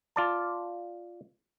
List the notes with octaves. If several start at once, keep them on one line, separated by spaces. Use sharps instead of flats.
F4 D5 A5